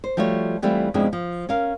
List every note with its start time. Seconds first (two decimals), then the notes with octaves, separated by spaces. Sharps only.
0.04 C5
0.17 F3 G3 A3 F#4 C#5
0.62 E3 G3 A3 C4 E4 F4
0.94 F2 B2 G#3 C4 D4 E4
1.13 F3
1.49 C#4 A#4 F5